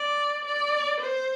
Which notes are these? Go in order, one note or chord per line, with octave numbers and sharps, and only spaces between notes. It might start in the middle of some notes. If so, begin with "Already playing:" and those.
Already playing: D5
D5
C5